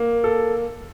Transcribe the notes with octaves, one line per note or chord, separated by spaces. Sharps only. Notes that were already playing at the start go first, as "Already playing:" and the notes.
Already playing: A#3
A4